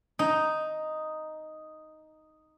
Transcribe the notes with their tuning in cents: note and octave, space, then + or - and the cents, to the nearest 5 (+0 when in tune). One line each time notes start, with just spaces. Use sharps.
D#4 +0